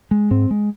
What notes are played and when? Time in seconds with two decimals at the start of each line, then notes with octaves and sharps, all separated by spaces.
0.11 G#3
0.31 G#2 C4
0.51 G#3